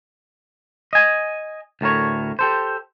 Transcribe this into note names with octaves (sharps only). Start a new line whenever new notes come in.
D#5 G#5
D2 A2 A#4 C#5
G4 A4 C5